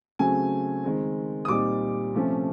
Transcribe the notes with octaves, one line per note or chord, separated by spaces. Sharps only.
C#3 F#3 A3 C4 G#5
D#3 G#3 C4
D#6
A#2 G3 C4 D#4 D6
C3 F3 A3 C#4